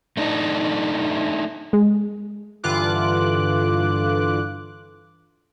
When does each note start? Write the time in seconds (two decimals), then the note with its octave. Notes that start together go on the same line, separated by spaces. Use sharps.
0.17 A3 D4 D#4
1.73 G#3
2.63 G2 D3 E3 F4 D6 F#6